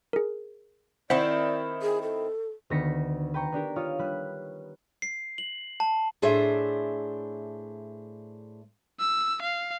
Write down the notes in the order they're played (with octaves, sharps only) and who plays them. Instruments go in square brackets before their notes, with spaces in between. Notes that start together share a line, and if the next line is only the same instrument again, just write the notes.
[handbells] G#4 A#4
[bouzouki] D#3 C4 E4 [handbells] C5 F#5 B6 [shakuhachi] D5
[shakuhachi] G#4
A4
[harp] D2 D#3 B3 A#6 B6 C#7
B4 G5 A#5 C#6
B3 D4 G4 A#4
F4 C#5 D#6 F6
G3 B4 F#6
[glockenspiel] C7
F#7
A5
[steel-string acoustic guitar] A2 D4 G#4 C5 E5
[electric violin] E6
F5